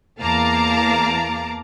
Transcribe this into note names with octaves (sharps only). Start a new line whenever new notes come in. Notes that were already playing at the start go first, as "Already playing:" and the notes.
E2 A#3 F5 A5 A#5 D6